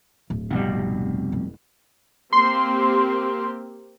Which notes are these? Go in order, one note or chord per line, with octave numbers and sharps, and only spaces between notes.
D1
F1 B2 G3
F#1
A#3 C4 G4 C6